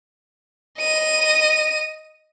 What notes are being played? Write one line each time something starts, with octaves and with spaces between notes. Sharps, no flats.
D#5 D#7